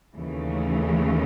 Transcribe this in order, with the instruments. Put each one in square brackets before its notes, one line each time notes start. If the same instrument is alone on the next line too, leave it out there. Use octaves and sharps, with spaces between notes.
[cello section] D#2 C#3 E3 A3